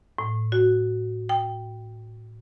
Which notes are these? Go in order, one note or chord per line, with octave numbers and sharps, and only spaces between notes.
A2
F#4
G5